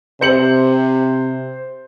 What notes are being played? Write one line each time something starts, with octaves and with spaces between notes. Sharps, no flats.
C3 C5 C#7 F#7